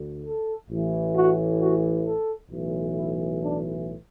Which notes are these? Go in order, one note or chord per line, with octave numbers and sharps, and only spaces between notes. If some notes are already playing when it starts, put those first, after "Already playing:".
Already playing: D2 D3
A4
A1 A2 E3
F#4
F#4
A4
B1 A2 E3
E4
D4